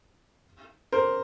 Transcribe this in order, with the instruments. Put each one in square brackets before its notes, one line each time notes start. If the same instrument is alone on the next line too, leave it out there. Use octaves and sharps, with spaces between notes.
[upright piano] A#4 C5